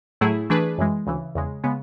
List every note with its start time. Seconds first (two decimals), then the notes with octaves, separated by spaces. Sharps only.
0.21 A2 F#3 A3 E4 G#4
0.50 E3 A3 D4 G#4 B4
0.78 F#2 E3 G#3
1.07 D2 C#3 E3
1.35 E2 C#3 G#3
1.64 C#3 G#3 B3